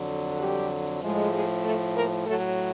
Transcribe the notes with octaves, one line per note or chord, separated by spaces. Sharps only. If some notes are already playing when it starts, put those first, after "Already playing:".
Already playing: F2 D3 F#3
G3 G4
A2 F3 G#3
G#3 G#4
A3 A4
A#3 A#4
A2 F#3 A3 A4